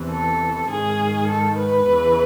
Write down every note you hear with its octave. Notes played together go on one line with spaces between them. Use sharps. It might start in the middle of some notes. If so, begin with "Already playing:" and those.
Already playing: E2 C3 E3
A4
G#2 D#3 G#4
A4
B4
E2 C#3 E3